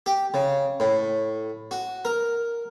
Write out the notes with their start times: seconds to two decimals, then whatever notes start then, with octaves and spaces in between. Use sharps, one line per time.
0.06 G4
0.34 C#3
0.80 A2
1.71 F#4
2.05 A#4